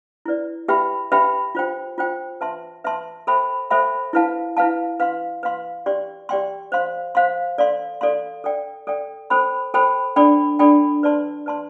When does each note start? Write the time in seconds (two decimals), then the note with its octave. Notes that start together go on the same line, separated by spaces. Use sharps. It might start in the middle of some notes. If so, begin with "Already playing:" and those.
0.26 E4 B4 D5
0.68 G4 B4 E5 G5 B5
1.12 G4 B4 E5 G5 B5
1.55 F4 C5 G5
1.98 F4 C5 G5
2.41 B4 E5 A5 C6
2.84 B4 E5 A5 C6
3.27 A4 C5 E5 G5 B5
3.70 A4 C5 E5 G5 B5
4.13 E4 B4 F5 A5
4.57 E4 B4 F5 A5
5.00 B4 F5 C6
5.43 B4 F5 C6
5.86 G4 D5 G5 C6
6.29 G4 D5 G5 C6
6.72 C5 F5 C6
7.15 C5 F5 C6
7.58 A4 D5 F5 C6
8.01 A4 D5 F5 C6
8.44 A4 D5 G5
8.87 A4 D5 G5
9.30 A4 C5 G5 B5
9.74 A4 C5 G5 B5
10.16 D4 A4 D5 G5 B5
10.59 D4 A4 D5 G5 B5
11.03 B4 D5 A5 C6
11.46 B4 D5 A5 C6